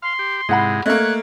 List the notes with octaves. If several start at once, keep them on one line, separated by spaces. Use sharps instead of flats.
F5 C6
G4
G#2 C3 G#3 E4 F#5 B5
A3 A#3 C#5 D#5 F#6